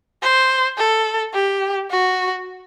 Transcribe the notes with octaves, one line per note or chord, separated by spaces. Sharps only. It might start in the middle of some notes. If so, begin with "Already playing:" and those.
C5
A4
G4
F#4